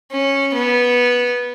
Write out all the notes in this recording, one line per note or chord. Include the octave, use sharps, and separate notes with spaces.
C#4
B3